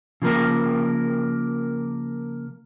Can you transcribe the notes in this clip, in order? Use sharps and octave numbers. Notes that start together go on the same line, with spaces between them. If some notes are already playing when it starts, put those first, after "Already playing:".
C#3 F3 A#3 A#4